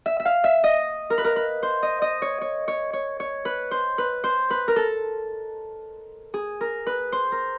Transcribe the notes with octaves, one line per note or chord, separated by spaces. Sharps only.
E5
E5
F5
E5
D#5
A#4
B4
A#4
B4
C5
D#5
D#5
C#5
C#5
C#5
C#5
C#5
B4
C5
B4
C5
B4
A#4
A4
G#4
A#4
B4
C5
A#4